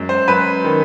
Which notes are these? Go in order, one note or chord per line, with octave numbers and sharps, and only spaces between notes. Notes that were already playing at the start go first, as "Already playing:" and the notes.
Already playing: F#2 G#3
C5
F#2 B4
D#3